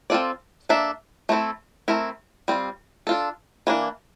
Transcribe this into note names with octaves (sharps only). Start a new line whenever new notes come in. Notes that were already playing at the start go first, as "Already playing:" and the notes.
C4 F4 A4 D5
A#3 D4 A4 E5
A3 C4 E4 A4
A3 C4 E4 A#4
G3 C4 F4
D4 F4 A4
E3 A#3 D4